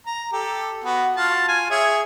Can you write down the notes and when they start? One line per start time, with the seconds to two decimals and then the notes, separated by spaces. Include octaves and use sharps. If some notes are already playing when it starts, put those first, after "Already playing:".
0.06 A#5
0.33 G4 A4
0.84 B3 F#4
1.16 F4 F#4 A5
1.48 F4 G#5
1.70 G#4 C#5 E5